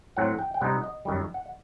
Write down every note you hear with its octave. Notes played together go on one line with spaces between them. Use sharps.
A2 F#3 C4 F#5
G5
G5
C3 G3 C4 D#4 F#5
D#5
F#2 D#3 G3
F#5